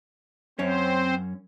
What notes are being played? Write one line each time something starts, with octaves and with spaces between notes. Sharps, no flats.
F#2 C4 C#4 C5